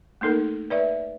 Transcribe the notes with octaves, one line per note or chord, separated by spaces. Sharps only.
A3 A#3 D#4 A4 A#4
B4 D5 E5